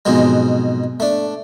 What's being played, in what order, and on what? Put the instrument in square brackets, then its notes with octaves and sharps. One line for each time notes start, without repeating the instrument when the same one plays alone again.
[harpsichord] F2 G#2 B2 F#3 G#3
A3 D4